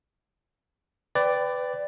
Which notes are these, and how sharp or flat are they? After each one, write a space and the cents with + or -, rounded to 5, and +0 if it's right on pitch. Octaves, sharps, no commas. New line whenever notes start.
B4 +25 D5 +0 G5 +0